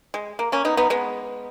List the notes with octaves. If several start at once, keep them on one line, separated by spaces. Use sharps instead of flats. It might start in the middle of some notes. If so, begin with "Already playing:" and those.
G#3
A#3
A#3 C#4
B3 D#4
B3 D#4
G#3 B3